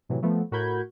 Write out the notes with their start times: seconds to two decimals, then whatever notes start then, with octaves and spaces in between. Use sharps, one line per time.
0.09 A2 C3 E3 F#3
0.22 F3 A3 B3
0.51 A2 F#4 A#4 B5 G6 G#6